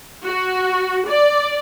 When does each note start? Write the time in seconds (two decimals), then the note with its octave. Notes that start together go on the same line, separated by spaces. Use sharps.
0.25 F#4
1.07 D5